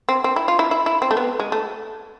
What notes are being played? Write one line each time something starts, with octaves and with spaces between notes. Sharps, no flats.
C4
C4
E4
F4
E4
E4
E4
C4
A3
B3
G#3
A3